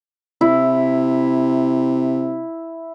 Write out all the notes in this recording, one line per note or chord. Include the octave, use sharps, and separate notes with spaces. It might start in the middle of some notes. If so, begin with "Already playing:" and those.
C3 E4